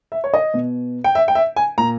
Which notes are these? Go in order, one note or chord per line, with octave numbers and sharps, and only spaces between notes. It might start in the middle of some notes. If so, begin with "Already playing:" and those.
E5
C#5
D#5
B2
G5
E5
G5
E5
G#5
A#2 A#5